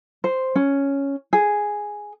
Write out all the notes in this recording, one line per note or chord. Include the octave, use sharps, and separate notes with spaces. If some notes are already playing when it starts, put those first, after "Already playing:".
C5
C#4
G#4